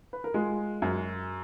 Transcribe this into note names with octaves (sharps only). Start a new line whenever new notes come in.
B4
A#4
G#3 F4 G#4
F#2